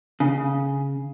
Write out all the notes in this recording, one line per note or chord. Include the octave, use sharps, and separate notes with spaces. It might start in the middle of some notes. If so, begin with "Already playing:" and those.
C#3